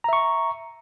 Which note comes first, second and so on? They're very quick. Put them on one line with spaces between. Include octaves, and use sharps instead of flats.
A#5 E5 C#6